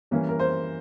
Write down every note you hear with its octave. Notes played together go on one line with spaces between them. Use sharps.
E3 G3 A#3 C#4
A#4
C5